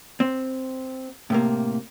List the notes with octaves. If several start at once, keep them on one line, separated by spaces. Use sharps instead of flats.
C4
A2 C3 A#3